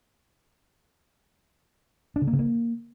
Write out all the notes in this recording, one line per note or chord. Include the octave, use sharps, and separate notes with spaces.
D4
C#3
A#3
C#3
A#3